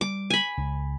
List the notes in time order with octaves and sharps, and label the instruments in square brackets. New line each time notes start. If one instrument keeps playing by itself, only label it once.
[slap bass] G3 [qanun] D6
[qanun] G#5 B5
[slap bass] C#2